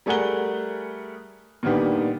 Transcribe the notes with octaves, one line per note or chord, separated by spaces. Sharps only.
G3 A3 G#4 A#4 F#5 G7
A#2 D3 D#3 G3 B3 G4